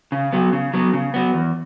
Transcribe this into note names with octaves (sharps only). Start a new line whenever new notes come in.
C#3
F#3 B3
C#3
F#3 B3
C#3
F#3 B3
E2